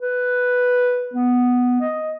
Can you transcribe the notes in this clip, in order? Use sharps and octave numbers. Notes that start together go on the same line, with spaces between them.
B4
B3
D#5